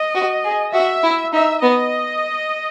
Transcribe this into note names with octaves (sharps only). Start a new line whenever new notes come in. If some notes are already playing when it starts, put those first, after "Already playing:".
Already playing: D#5
F#4
G#4
F#4 E5
E4
D#4 E5
B3 D#5